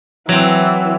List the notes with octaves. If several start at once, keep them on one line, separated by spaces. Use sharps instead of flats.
E3 F#3 C4